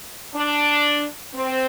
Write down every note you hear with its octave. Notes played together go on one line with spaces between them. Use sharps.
D4
C4